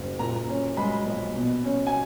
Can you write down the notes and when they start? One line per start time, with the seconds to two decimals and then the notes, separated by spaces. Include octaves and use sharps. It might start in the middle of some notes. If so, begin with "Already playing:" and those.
Already playing: F#1
0.19 A#2 A#5
0.48 C#4
0.77 G#3 B5
1.06 A#1
1.35 B2
1.64 C#4
1.87 G#5